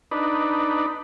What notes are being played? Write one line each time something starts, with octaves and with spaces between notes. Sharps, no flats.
D4 D#4 B4